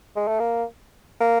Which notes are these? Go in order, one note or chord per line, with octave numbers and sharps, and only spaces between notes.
G#3
A3
A#3
A#3